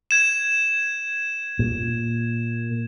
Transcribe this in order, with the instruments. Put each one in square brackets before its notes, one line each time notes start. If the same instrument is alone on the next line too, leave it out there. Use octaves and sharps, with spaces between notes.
[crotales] G#6 E7
[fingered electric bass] A#2